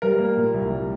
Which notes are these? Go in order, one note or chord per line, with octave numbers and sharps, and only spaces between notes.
G3 A#4
A#3
A#2
C2
G3